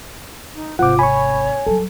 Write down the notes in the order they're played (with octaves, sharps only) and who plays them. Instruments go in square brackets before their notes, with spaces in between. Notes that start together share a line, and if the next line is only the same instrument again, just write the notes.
[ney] D#4
[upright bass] G#1 C3 [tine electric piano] F4 D6 [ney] C5 [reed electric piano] F#5
[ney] C#5 [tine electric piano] G#5 [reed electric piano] B5 C#6
[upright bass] F#3 G3 [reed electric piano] A4